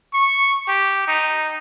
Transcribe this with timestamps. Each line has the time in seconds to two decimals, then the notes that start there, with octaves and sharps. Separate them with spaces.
0.14 C#6
0.68 G4
1.08 D#4